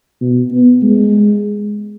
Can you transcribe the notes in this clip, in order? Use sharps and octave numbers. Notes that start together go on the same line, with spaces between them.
B2
B3
G#3